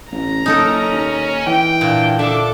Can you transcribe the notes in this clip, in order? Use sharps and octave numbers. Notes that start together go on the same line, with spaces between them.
A1 A#5
F#1 C#4 D#4 A4 A#4
D#2
E3 G5
A#2 D4
D3 D4 A4 E5 D6